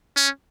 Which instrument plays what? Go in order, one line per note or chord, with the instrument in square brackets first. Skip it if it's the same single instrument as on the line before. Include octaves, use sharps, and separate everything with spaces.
[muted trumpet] C#4